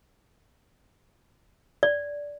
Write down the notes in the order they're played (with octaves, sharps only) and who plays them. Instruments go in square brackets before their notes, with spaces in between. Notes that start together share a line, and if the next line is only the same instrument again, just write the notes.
[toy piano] D5